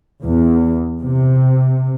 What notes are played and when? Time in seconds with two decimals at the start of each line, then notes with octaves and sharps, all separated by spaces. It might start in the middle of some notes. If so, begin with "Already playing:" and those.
0.23 E2
1.02 C3